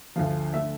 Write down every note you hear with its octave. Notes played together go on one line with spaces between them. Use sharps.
D2 D3 F3 F5
D3 A3 E5